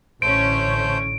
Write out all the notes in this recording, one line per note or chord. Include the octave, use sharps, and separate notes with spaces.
A1 D3 A3 C#4 C5 C#5 G6 D7